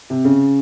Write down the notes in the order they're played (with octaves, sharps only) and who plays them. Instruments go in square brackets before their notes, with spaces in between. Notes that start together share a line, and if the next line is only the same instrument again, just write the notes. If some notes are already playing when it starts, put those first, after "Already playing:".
[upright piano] C3
C#3